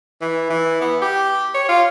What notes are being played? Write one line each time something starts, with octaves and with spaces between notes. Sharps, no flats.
E3
E3
B3
G4
C#5
F4